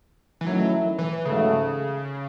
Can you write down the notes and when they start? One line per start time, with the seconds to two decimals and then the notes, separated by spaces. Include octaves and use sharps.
0.41 E3
0.47 D#3 F#3 A3 C#4 E4
0.98 E3
1.25 G#2 C#3 F#3 A3